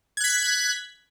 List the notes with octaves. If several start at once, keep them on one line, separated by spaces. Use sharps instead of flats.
F#6 G#6 B6